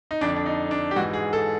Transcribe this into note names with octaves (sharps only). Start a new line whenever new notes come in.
D#4
F2 D3 D4
D4
D#4
D4
G4
G#2 E3 F#4
G#4
A4